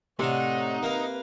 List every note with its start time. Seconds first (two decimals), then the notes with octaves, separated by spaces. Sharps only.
0.19 A2 C3 D4 D#4 C#5 F#5
0.83 A#3 B4 F5